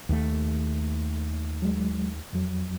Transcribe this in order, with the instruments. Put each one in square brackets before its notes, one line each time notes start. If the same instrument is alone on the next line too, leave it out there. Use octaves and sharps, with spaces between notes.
[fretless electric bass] D#2 A3
[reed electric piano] F#3 G#3
F2 F#3